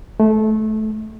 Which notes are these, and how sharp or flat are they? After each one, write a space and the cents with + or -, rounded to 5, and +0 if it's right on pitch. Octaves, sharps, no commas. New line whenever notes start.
A3 -20